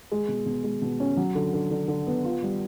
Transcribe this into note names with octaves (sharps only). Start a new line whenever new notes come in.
G#3
B2
B2
G#3
B2
C#4
F#3
D3
D3
D3
D3
B3
F4
G3